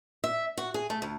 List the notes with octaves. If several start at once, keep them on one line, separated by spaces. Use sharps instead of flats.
E5
F#4
G#4
A3
D2